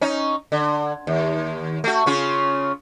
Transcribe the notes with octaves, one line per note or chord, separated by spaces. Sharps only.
C#4 D#4
D3
D#2
A3 F#4
C#3 C#4 F4